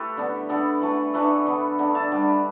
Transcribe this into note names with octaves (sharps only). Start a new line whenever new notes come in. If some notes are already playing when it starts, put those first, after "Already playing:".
Already playing: A3 E4 G4 A4 B4
D3 B3 D4
D3 B3 D4 A4 D5
E3 A3 D4
E3 A3 D4 B4 E5
D3 B3 D4
D3 B3 D4
E5 A5
D3 G3 D4